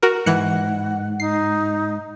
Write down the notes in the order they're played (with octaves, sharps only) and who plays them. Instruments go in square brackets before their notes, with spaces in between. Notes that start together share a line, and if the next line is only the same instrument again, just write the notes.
[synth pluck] F#4 A#4
[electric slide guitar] G#2 [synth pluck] E3 F#6 C#7 [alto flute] F#5
[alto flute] D#4 [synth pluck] C7